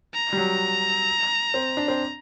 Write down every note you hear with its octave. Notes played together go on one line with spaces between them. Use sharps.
A#5
G3
F#3
C4
D4
C4